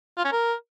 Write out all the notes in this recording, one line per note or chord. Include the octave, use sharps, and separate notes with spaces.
F4
C#4
A#4